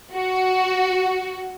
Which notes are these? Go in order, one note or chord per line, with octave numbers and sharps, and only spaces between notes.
F#4